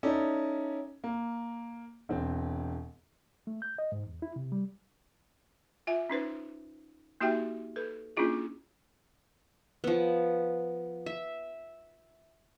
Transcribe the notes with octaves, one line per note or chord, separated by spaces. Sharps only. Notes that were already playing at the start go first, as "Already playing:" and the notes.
C#4 D#4 E4 A4 D5
A#3
E1 E3 C4
A3
G6
D#5
G#2
E2
E4
C3
G3
F4 E5 G#5
C#4 D#4 B4 C5
A#3 D#4 F#4 G4 E5 G5
A4 B4
A#3 C#4 D4 E4 F4 G#4
F3 B3
E5